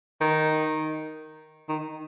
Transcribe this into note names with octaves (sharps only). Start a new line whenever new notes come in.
D#3
D#3